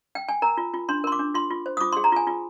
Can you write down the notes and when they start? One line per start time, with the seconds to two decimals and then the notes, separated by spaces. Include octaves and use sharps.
0.15 G5
0.29 G#5
0.42 A#4 A#5
0.57 F4
0.74 F4
0.89 D4 C6
1.04 A#4 C6
1.12 D6
1.19 D4
1.34 F4 C6
1.50 F4
1.66 C5
1.77 D#6
1.81 F4 D6
1.92 G#4 C6
2.04 A#5
2.12 F4 G#5
2.27 F4